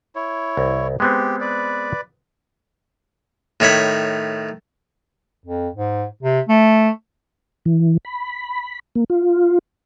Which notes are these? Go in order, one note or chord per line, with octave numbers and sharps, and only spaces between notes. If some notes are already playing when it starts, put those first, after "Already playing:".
E4 C#5
C2
G#3 B3 C4 G4
B4 D5
A2 D#3 C#5 B5
F2
G#2
C3
A3
E3
B5
A#3
F4